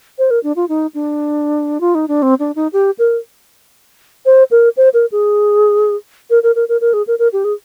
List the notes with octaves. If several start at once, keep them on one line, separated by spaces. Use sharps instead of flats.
C5
A#4
D4
F4
D#4
D4
F4
D#4
D4
C4
D4
D#4
G4
A#4
C5
A#4
C5
A#4
G#4
A#4
A#4
A#4
A#4
A#4
G#4
A#4
A#4
G4
G#4